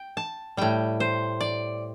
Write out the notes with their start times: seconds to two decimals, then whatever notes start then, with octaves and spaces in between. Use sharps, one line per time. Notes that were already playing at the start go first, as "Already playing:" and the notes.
Already playing: G5
0.17 A5
0.57 A2 G3 G5
1.00 C5
1.41 D5